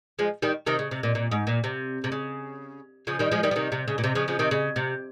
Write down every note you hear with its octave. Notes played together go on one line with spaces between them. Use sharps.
F3 G#3
D#3 G3
C3 D#3
C#3
C3
A#2
A#2
G#2
A#2
C3
C3
C#3
C#3 F3
D#3 G3
F3 G#3
D#3 G3
F3
C3 D#3
C3
C#3
A#2
C3
C#3 F3
C#3 F3
C3 D#3
C#3
C3